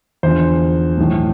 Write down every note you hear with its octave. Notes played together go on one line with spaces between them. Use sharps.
E2 D3 F3 C5
B1 A2 E3